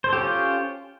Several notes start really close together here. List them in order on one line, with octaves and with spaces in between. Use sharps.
C5 A4 G4 C#4 F4